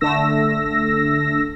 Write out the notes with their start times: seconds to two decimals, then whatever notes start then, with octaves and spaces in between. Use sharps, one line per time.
0.01 D3 A3 E6 A#6